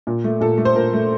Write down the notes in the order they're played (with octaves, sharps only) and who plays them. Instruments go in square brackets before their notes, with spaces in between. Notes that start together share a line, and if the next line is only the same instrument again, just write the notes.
[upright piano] A#2
A3
A#2 A4
A3
C5
A#2 A#4
A3